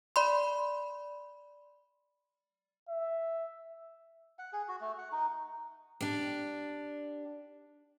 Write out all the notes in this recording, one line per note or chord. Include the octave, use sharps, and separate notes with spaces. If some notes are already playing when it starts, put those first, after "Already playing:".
D5 B5 C6
E5
F#5
G#4
F#4
A3
F#5
D#4
D4 G4